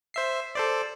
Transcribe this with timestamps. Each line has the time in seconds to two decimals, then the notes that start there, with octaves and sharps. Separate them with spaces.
0.14 C5 E5 C7
0.55 A4 C5 D5